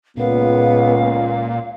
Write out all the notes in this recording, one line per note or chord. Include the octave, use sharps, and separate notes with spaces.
C#2 A#2 B3 F5